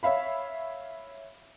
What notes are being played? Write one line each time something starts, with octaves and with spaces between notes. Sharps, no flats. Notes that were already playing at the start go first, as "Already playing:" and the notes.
C#5 E5 F5 B5